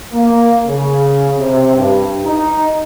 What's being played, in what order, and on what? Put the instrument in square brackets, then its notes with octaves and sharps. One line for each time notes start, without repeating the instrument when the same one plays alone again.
[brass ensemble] A#3
C#3
C3
G2
D#4